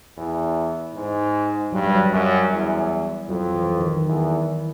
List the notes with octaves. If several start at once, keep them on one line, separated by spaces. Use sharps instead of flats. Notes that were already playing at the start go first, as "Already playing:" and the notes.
E2
G#2
G2 F#3
G3
F#3
F#2
E2
F2 F#3
E3
D#3
E2